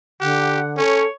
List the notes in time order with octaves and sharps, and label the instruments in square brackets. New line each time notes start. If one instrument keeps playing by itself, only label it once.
[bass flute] D3 [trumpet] G4 [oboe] F#5
[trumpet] C#4 [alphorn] A4 [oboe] C#5